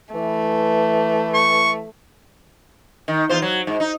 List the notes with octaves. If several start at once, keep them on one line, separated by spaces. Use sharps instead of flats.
E3 A3
C#6
D#3
E2 F4 C5
F#3
G#2
D#4